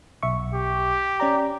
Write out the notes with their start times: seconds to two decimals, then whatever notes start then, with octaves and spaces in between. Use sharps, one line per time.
0.23 B1 E5 C#6
0.54 G4
1.20 C#4 D5 A#5